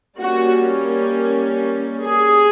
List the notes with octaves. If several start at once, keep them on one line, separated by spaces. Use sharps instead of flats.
G3 A#3 C#4 F#4
G#4